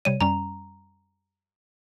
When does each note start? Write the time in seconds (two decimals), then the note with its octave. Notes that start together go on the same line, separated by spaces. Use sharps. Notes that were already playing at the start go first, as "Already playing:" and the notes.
0.05 C3 G3 C#5 D#7
0.21 F#2 G3 C#4 A#5